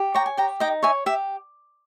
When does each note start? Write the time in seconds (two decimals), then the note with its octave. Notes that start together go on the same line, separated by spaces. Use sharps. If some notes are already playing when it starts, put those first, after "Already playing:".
Already playing: G4
0.14 C#5 G5 A#5
0.26 G#5
0.37 G4 G5 A#5
0.60 D#4 D#5 G5
0.83 C#5 E5 G#5
1.06 G4 E5